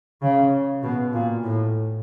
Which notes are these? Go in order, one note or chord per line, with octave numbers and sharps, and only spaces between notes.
C#3
B2
A#2
A2